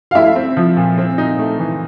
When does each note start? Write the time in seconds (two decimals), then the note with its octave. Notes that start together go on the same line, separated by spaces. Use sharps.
0.11 F5
0.15 A3 E4 E5
0.36 C4
0.57 F3
0.77 A#2
0.98 C4
1.18 D#4
1.39 A3
1.59 E3